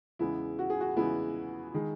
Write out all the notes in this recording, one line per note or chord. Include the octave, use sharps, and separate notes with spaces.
E2 C#3 G#3 B3 E4
F#4
G#4
F#4
E2 C#3 G#3 B3 E4
D#3 G#3